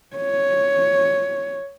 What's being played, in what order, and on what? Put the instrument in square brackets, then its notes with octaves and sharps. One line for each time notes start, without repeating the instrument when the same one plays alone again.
[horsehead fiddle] C#5